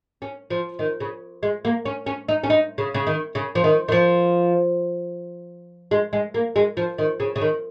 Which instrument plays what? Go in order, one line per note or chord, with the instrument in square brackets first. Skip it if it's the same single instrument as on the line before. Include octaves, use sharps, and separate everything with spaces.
[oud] C#4
F3
D#3
C#3
G#3
A#3
C#4
C#4
D#4
C#4
D#4
C#3
C#3
D#3
C#3
F3
D#3
D#3
F3
G#3
G#3
A#3
G#3
F3
D#3
C#3
C#3
D#3